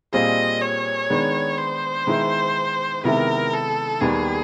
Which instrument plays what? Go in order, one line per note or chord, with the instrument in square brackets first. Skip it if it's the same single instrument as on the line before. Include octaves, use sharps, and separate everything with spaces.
[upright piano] A#2 G3 C4 F4 G#4 [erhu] D#5
[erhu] C#5
[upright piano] D#3 G#3 B3 D4
[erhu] C5
[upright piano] D#3 G#3 B3 E4
[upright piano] C3 D#3 G#3 B3 E4 [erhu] A#4
[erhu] A4
[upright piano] D#2 D#3 G3 B3 [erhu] G#4